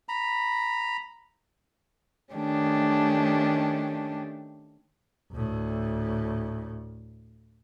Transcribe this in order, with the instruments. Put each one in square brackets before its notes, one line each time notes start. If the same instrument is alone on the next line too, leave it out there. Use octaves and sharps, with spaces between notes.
[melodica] A#5 B5
[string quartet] D#3 A3 C#4 D4 G4
[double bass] D2 A2